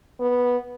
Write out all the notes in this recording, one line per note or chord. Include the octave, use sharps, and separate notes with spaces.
B3